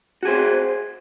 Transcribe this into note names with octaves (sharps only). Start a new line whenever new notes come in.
F#4 G#4 C5